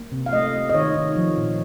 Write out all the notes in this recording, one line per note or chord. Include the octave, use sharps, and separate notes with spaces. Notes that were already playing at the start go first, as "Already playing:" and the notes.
Already playing: A#3
C3
F5
A3 D#5
A3
D#5
D#3 C#5
D#3
F3
A#2